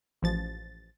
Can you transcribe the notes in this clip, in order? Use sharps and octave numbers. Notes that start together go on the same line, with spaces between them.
A1 F3 A6